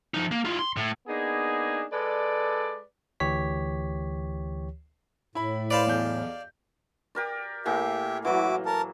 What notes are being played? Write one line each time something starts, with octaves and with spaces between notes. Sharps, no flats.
F3 D#4
A#3
E4 F4
C6
A2
A#3 B3 D4 D#4 G#4
G#3 A4 B4 D5
D2 E3 G4 C#5 B6
A2 E4 B5
B4 C5 D5 F5 A5 B5
B1 E2 G6
G4 A#4 D5
A2 A#3 G4 G#4 E5
E3 F#3 E4 F#4 D6
A#4 A5